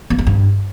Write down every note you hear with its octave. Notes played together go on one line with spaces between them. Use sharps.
A#3
G#3
G2